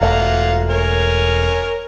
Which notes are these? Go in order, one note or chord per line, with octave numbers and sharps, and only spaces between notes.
E1 A3 F4 F#5 A#5
A#4 C#5 G#5